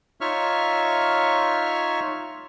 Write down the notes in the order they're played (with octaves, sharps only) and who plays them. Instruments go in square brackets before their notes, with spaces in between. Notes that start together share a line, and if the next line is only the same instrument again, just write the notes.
[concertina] D#4 F4 C#5 E5 C#6 F6